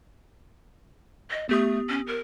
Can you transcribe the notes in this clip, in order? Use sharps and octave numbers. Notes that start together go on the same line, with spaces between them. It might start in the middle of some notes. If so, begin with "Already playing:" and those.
D#5
A3 B3 G4 D#6
C#4
A#4